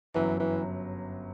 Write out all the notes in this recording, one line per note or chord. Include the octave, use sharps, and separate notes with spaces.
G1 F#2 E3 F#3
E3